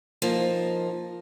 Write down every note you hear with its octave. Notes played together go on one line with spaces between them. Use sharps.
F3 A#3 D#4